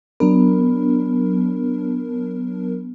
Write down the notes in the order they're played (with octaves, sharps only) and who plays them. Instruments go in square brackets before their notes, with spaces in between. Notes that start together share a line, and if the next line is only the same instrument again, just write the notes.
[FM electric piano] F#3 D4 A#4 [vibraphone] B3